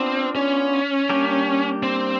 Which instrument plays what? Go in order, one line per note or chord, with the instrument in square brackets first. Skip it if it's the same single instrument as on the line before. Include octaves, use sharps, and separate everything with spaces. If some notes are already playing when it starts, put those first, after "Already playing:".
Already playing: [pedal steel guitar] B3 D4 F4 [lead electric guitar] C4
[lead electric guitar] C#4
[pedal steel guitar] G3 A#3 D4 G4 A#4
[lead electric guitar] C4